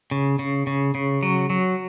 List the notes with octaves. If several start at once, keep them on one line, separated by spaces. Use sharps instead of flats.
C#3
C#3
C#3
C#3
F#3
F#3